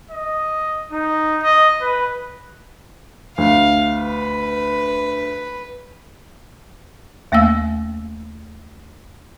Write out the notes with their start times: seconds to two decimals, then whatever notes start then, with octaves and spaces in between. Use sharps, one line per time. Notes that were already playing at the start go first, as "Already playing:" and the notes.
0.11 D#5
0.92 D#4
1.42 D#5
1.81 B4
3.38 D2 F5
4.02 B4
7.32 D#2 A3 A#3 F5 E6